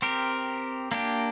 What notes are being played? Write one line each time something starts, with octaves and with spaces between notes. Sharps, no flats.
C4 G4 A#4
A#3 D4 G4